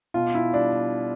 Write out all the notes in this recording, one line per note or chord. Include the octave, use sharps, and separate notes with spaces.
B2 F4
E4
G3 D4